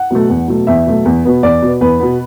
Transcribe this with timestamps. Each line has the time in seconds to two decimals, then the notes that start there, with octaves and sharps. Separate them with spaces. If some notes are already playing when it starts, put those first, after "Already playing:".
Already playing: F#5
0.10 B2 F#3 A3
0.29 E2
0.48 B2 F#3 A3
0.67 E2 E5
0.87 B2 F#3 A3
1.05 E2
1.25 B2 B3
1.43 E2 D5
1.62 B2 B3
1.81 E2 B4
2.00 B2 B3